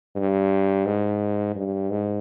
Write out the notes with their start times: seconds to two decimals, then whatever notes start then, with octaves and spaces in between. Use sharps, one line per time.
0.15 G2
0.86 G#2
1.56 G2
1.90 G#2